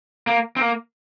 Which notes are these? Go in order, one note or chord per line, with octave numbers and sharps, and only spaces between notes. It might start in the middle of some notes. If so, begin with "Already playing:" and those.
A#3
C4
A#3